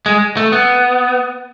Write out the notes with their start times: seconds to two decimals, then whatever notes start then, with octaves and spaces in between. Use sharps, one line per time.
0.06 G#3
0.37 A3
0.52 B3